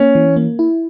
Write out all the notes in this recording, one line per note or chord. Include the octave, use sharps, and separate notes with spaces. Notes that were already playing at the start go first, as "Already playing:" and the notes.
Already playing: A#3 C#4
E3
A#3
E4